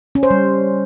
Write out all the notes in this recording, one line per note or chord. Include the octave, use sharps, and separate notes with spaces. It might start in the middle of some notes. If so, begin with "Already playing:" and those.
C#4
C5
G3